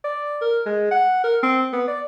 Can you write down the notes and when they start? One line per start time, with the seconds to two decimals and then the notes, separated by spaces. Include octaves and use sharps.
0.04 D5
0.41 A#4
0.66 G#3
0.91 F#5
1.24 A#4
1.43 C4
1.73 B3
1.88 D5